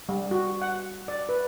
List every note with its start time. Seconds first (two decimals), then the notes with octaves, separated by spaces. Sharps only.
0.09 G3
0.31 F#4
0.62 F#5
1.08 D5
1.29 B4